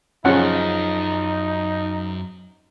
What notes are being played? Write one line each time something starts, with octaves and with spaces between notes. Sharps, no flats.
F#2 C#3 F3 C#4 D#4 F#5